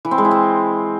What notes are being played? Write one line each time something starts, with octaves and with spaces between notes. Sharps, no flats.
E3
C4
G#3
E4
C4